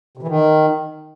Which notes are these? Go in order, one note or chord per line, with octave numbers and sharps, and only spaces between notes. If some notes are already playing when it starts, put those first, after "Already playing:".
C3
E3
D#3